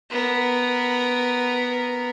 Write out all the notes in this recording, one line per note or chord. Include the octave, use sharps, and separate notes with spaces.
B3 A#4